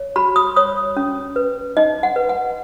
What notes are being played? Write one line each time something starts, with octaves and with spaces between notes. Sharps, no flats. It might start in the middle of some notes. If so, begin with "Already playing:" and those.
Already playing: C#5
F#4 B5
D#6
C#5 D#6
C#4
B4
D#4 D#5
F#5
B4
F#5